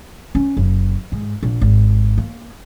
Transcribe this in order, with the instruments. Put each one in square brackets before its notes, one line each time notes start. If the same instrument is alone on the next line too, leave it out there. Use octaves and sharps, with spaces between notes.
[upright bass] C#4
F#1
G#2
A#1
G#1
A#3